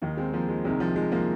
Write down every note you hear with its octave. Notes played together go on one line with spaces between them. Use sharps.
D#2 D#3 A#3 D#4
G#3 C4
F3 A#3
G#3
C2 C3 D#3 G#3
F3
G#3
F3 A#3